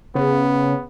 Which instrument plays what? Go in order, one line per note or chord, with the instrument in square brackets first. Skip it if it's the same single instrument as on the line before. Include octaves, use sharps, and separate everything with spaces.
[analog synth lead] C#3 [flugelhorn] B3